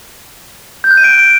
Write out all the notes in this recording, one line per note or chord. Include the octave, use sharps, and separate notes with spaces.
G6
F#6
D#7
D7